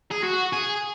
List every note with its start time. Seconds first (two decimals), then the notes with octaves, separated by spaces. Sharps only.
0.11 G#4
0.23 F#4
0.53 G#4